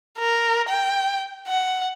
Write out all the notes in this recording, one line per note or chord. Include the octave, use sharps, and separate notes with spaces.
A#4
G5
F#5